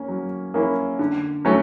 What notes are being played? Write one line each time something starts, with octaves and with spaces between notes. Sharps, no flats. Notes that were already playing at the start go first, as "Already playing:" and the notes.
Already playing: A#3 C#4
F#3
A#3 C#4 E4
D3
F#3 A3 C#4